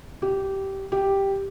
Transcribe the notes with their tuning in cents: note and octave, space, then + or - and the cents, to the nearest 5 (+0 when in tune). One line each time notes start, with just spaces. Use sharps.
G4 -15
G4 +0